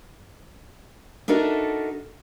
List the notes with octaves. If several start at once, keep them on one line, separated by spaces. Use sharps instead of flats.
D4 D#4 F#4 A4 A#4 E5